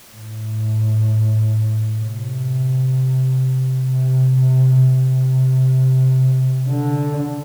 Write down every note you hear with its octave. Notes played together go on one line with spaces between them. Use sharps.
A2
C3
C3
C3
C3
D3